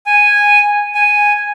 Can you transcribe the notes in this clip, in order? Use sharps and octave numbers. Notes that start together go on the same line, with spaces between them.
G#5
G#5